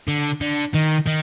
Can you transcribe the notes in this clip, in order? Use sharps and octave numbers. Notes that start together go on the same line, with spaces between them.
D3
D3
D#3
D#3